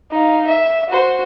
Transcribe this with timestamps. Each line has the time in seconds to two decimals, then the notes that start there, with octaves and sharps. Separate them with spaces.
0.11 D#4 F5
0.47 E5
0.89 F#4 C5